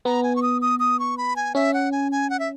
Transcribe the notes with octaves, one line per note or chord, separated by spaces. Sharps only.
B3 A#5
G#5
C#6
D#6
D#6
D#6
C#6
B5
G#5
C#4 E5
F#5
G#5
G#5
F#5
E5